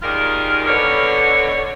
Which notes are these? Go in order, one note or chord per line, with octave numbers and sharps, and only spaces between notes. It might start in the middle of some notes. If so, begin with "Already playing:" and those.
D#2 D#3 G3 F4 G#4 A#4
B2 D3 C#5